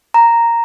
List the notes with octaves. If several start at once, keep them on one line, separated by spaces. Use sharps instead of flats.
A#5